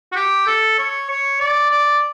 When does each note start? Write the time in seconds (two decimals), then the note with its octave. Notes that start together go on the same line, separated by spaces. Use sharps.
0.12 F#4
0.15 G4
0.47 A4
0.78 C#5
1.10 C#5
1.40 D5
1.71 D5